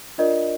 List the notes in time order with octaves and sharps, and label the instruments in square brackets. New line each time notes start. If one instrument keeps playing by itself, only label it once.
[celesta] D4 F4 A#4 D5 D#5